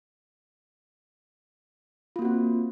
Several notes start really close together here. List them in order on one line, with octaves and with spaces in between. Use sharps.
F4 A#3 F#4 C4